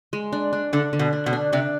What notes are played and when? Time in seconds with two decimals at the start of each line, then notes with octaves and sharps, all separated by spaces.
0.13 G#3
0.33 D4
0.53 D4
0.73 D3 D4
0.93 D3
0.99 B2
1.13 D4
1.26 B2
1.33 D4
1.53 C3 D4